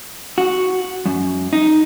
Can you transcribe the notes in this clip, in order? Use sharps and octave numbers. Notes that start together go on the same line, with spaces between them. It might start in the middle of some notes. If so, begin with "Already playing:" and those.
F#4
F#2
D#4